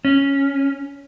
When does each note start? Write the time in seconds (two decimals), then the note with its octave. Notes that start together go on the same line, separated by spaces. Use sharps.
0.05 C#4